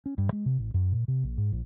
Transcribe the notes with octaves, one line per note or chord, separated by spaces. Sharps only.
C#4
G2
G#3
C3
A1
F#2
A#2
C3
A#1
G#2
A#1